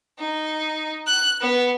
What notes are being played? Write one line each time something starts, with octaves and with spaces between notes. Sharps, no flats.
D#4
F#6
B3